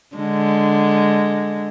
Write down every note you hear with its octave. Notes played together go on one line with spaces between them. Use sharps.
D3 G#3